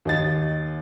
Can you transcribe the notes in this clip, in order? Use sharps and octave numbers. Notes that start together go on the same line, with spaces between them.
D#2 D#5 A6